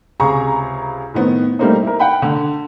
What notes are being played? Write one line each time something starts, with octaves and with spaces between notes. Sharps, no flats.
C#2 C3 G#4 F5 A#5 C#6
A2 D#3 B3 C4
G3 A3 A#3 C4 D#4
E4 A#4
F#5 G5 B5
D3